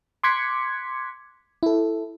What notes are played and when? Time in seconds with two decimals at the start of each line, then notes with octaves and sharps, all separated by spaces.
0.24 C6 D6 F#6 G#6 B6 C#7
1.63 E4 A4